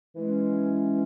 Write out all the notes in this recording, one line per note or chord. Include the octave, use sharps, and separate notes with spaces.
E3 G#3 C#4